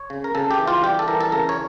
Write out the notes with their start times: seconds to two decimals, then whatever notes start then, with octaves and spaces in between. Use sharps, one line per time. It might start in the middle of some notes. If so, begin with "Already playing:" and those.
Already playing: C#5
0.10 C#3
0.24 A#4
0.35 C#3 A4
0.51 G4
0.59 E3
0.67 F4
0.84 G3 G4
0.99 A4
1.08 E3 A#4
1.21 A4
1.32 C#3 A#4
1.49 C#5